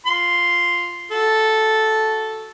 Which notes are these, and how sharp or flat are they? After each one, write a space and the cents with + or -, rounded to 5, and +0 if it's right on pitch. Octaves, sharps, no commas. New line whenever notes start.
F4 +0 C6 +0
F#4 +0 A4 -5